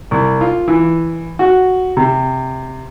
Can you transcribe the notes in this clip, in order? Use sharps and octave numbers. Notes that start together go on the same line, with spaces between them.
C2
F4
E3
F#4
C3